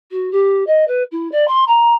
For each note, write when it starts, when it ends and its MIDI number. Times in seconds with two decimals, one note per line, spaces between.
0.11 0.31 66
0.31 0.65 67
0.66 0.86 75
0.87 1.03 71
1.11 1.30 64
1.31 1.45 74
1.47 1.64 84
1.67 1.93 82